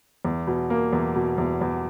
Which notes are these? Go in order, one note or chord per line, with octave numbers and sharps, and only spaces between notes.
E2
B2
A#3
E2
B2
E2
E2